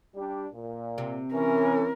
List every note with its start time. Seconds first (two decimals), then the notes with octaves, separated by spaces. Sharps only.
0.15 G3 D4 G4
0.53 A#2
0.98 C3
1.33 E3 C#4 A#4